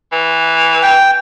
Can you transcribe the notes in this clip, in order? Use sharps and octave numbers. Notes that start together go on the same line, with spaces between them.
E3
G5